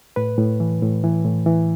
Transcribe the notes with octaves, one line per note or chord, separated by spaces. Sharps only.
A2 B4
A2
E3
A2
E3
A2
E3